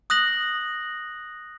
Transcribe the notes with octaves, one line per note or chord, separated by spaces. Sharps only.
D#6 F#6 A#6 F#7